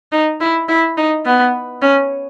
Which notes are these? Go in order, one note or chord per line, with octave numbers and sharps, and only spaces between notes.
D#4
E4
E4
D#4
B3
C#4